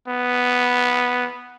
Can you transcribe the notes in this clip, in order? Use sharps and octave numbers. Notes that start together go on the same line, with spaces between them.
B3